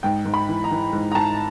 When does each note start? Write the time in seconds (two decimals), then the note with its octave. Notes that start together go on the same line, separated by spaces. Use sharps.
0.03 G#2 G5
0.25 G#2
0.34 B5
0.49 E3
0.64 A#5
0.72 E3
0.93 G#2
1.12 A#5
1.15 G#2 A5